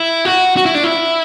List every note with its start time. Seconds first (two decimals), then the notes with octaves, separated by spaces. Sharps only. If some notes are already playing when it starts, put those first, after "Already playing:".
Already playing: E4
0.25 F#4
0.57 F#4
0.66 E4
0.75 D4
0.84 E4